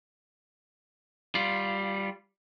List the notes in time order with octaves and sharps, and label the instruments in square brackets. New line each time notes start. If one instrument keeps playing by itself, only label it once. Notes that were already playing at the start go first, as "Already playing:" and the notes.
[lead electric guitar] G3 F4